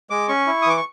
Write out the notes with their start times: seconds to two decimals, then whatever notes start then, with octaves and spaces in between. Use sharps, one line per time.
0.10 G#3 D6
0.28 C#4 C#6
0.47 E4
0.62 D#6
0.66 E3 D6
0.77 C#6